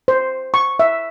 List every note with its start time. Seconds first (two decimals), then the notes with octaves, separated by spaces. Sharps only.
0.08 C5
0.54 C#6
0.79 E5